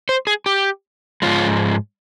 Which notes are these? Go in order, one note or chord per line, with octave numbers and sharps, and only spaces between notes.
C5
G#4
G4
G#2 F3 G#3 F4